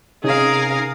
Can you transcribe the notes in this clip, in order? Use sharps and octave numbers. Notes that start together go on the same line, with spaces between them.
C3 C#4 D#4 G#4 A#4 F5